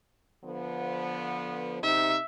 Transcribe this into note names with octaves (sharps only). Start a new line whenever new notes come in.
D3 F3 B3
C3 D#4 E5